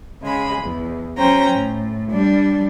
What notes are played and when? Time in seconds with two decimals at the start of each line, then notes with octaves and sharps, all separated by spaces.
0.22 C#3 G#3 B5
0.61 E2
1.17 F#3 C#4 C5 G5 A#5
1.50 A2
2.11 G3 D4